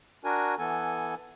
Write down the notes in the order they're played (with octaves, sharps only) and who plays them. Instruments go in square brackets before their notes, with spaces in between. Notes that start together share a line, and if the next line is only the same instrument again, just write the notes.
[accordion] D4 F#4 A#4 G#5
E3 B3 A4 G#5